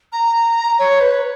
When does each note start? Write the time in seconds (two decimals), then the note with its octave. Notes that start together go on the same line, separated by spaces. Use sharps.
0.12 A#5
0.79 C#5
1.00 B4